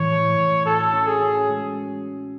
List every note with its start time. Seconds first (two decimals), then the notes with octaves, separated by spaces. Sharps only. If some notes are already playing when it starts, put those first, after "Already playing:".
Already playing: A2 E3 C#5
0.11 A3
0.39 A2
0.66 F#4 A4
0.93 C#4
1.07 G#4
1.21 C#4
1.48 G#3